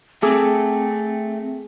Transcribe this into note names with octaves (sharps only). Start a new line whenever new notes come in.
A3 C4 G#4 D6 E6